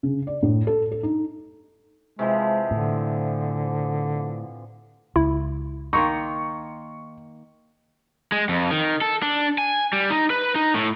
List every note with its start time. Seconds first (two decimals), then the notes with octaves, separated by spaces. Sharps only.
0.03 C#3
0.27 D5
0.43 A2
0.67 A4
0.92 A4
1.03 D#4
2.19 C3 E3 F3 G#3
2.71 A2 D3
5.16 C#2 E4
5.93 D#3 A#3 D#4 C6 C#6
8.32 G#3
8.49 F2
8.71 D#3
9.01 A4
9.22 D4
9.58 G#5
9.93 G3
10.10 D#4
10.30 B4
10.55 D#4
10.75 A2